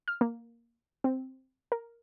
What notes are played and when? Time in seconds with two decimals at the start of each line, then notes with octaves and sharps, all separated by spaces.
0.08 F6
0.21 A#3
1.04 C4
1.72 A#4